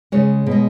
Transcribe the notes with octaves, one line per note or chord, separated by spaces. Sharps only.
C#3 G#3 C#5
B2 G#3